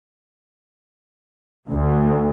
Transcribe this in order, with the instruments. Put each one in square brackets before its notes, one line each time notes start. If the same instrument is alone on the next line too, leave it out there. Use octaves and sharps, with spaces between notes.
[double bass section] D2